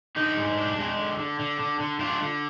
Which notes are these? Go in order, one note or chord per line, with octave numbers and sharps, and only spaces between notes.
D3 D#4
G#3
D4
G#3
D3
D3
D3
D3
D3
D3 D4 F4
D3